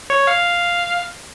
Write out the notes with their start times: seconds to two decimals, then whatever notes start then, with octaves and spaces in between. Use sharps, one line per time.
0.10 C#5
0.27 F5